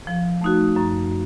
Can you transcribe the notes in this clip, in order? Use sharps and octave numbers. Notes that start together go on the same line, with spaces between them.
F3
A3 D#4 F#4
F#2